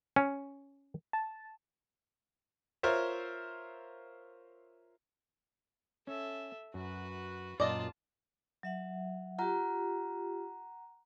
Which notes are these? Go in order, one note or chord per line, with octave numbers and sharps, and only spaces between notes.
C#4
A5
F4 A#4 C5 C#5 E5
C#4 A4 E5
F#2 F#4 B4
F#2 A#2 F#3 F4 D5 D#5 A5
F#3 E5 F#5
F4 G4 F#5 A#5